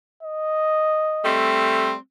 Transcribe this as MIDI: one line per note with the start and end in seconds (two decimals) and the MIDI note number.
0.23 1.36 75
1.25 1.94 55
1.25 1.94 57
1.25 1.94 60